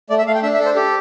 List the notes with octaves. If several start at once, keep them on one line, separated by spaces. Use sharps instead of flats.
A3 D5
E5
A3 F5
G5
D4 E5
E5
A4
C5
G4 A4